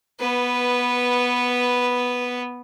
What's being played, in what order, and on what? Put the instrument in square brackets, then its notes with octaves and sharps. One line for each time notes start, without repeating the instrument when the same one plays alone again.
[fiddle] B3 B4